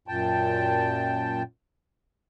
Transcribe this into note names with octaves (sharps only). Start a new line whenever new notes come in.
F#2 A#2 G5 A5